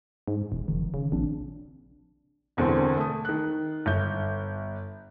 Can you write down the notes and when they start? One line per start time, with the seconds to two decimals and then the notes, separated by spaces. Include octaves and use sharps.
0.28 G#2
0.52 E1
0.68 F1 D#3 F3
0.94 C#3
1.12 A#1 C4 D4
2.57 E1 E2 D3 C4
2.97 A3 D#6
3.25 D#3 F#6
3.86 G1 G6